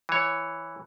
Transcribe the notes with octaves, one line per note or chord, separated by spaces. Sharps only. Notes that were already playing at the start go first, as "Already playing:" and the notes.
E3 C#5